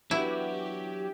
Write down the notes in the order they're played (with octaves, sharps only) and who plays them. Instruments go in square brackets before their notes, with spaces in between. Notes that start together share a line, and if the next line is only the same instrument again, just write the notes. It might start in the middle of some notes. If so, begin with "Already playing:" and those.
[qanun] E3 B3 D4 [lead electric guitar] F#3 F#4 [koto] E4 [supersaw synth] G4